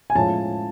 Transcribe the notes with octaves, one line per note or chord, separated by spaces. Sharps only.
G#5
A2 F3 G#3 C#4 A5